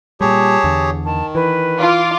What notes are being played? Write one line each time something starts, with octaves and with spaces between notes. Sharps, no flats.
A#2 G3 G4 G#4 C#5 A5
E2 D3
D#3 A5
E3 B4
F4 D6